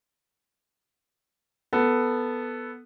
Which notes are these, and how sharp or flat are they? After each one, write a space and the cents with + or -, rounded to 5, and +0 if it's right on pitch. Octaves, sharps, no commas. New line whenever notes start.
B3 +0 A4 +5